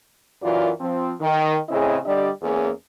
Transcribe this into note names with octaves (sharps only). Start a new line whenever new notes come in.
F#2 E3 F4 F#4 A#4 D5
F3 C4
D#3
A2 C#3 C4 E4 G#4 D#5
D3 G3 D4 G4 D5 D#5
E2 A#3 C#4 G#4